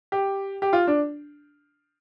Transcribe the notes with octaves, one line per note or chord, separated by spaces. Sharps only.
G4
G4
F4
D4